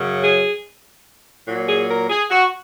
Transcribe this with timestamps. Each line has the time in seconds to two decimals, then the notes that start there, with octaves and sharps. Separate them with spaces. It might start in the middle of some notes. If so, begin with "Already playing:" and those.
Already playing: F#2 C#3 F#3
0.23 G#4
1.47 A#2 F#3
1.68 G#4
1.89 A#4
2.09 G#4
2.30 F#4